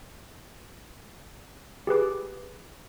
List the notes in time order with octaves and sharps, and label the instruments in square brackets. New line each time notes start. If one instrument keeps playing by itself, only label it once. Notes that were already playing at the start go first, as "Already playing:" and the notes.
[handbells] G4 G#4 B4 D6